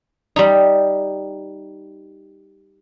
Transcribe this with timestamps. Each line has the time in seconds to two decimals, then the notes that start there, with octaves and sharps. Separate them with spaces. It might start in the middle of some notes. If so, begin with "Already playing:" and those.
0.36 G3 D#4